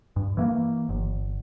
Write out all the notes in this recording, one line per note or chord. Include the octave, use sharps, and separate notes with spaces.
G2
E3 A3 A#3
G1